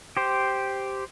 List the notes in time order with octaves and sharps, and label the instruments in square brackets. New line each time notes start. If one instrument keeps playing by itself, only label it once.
[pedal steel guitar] G4 C5